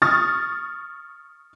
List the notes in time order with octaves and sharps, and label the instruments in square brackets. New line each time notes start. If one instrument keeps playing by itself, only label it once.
[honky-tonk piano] C#6 D#6 F6 A6